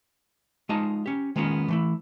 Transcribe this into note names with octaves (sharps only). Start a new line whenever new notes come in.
G#3 D#4 F4 D#5 A5
C#4 G4
D#3 G#3 A#3 B3 C#4 F4
E3 A3 E4